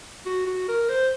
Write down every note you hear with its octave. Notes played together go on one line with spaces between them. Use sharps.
F#4
F#4
A#4
C5